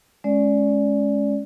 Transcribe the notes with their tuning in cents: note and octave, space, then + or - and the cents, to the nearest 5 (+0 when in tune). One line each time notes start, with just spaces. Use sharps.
G#3 +20 C#4 +0 D5 -15